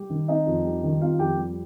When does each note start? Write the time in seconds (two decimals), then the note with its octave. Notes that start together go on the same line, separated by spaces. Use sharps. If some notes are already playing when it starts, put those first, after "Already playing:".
Already playing: G3 G4
0.10 D#3
0.28 C4 D#4 D#5
0.46 F2
0.64 G3
0.83 D#3
1.01 C4 F4 F5
1.19 F2 G4 G5
1.37 G3